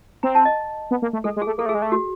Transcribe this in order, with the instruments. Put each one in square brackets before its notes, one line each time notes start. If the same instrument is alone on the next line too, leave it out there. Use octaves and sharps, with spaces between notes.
[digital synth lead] C4 [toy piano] A#5
[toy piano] A5
D#5
[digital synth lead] B3
A#3
A3
[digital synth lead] G#3 [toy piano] A4
[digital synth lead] G#3
[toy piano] G#4
[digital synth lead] A3
[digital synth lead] A#3 [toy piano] A4
[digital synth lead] A3
[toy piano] G#4
[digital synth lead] G#3
A3
[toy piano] F#4